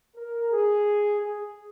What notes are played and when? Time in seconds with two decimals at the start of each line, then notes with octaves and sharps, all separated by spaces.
0.16 A#4
0.51 G#4
1.20 G#4